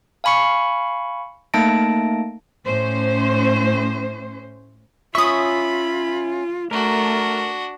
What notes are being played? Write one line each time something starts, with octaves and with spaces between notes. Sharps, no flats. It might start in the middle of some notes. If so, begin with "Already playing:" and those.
F5 G#5 B5 C#6 C#7
A3 A#3 D#4 A5 A#6 D7
A2 C#4 C5
C#4 F4 E5 B5 C#6 D#6
A3 D4 F#4 A#4